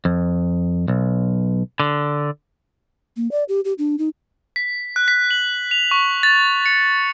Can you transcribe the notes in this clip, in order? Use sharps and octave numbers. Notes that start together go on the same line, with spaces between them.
F2
B1
D3
A#3
D5
G4
G4
D4
D#4
B6
F#6
B6
F#7
F7
C#6
A6
C#7